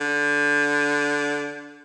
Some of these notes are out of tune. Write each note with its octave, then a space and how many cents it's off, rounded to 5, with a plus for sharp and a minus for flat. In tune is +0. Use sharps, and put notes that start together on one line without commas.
D3 -15